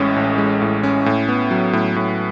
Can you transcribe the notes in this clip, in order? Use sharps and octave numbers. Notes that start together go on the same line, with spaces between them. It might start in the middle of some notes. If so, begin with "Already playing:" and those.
Already playing: A1 A2 G#3 C#4
A1
G#3
A2
C#4
A2
B3
F#3
A2
A2